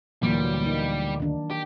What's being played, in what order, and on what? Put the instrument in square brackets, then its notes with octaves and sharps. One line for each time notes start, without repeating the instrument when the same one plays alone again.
[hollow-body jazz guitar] D2 A#2 [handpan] E3 F#3 A#3 [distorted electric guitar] G3
[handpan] A#3 D#4
D#3 D4
[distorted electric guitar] G4